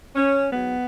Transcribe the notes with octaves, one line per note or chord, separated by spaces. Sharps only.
C#4
G#2 F#3 B3